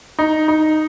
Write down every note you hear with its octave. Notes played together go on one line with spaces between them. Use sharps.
D#4
D#4